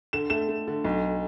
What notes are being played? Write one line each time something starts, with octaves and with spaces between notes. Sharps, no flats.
D3 E7
A3 E7
A3
D3
B1